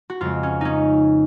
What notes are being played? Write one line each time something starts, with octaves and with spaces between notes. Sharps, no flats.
F#4
F2 C#3 G#3 F4
C#4
C#4 D#4